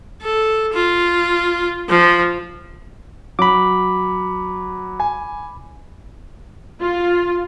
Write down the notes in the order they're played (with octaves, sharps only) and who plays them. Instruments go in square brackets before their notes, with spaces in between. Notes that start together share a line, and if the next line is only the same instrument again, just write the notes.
[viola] A4
F4
F3
[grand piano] F#3 [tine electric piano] B5 D6
[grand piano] G#5
[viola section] F4